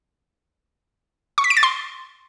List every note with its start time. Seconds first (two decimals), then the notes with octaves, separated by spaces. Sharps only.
1.38 C#6
1.44 B6
1.50 D7
1.57 A6
1.63 C6